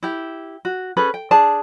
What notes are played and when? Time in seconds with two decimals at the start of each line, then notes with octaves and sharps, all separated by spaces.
0.03 E4 G4
0.65 F#4
0.97 C#4 G#4 A4 B4
1.14 G5
1.31 D4 G#4 A5